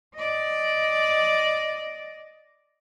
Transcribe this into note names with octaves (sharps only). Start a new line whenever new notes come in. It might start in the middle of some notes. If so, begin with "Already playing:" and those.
D5 D#5